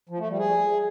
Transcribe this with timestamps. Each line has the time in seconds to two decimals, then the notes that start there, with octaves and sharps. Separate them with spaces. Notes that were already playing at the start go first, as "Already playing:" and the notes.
0.09 F3
0.19 A3
0.29 G3
0.38 G#4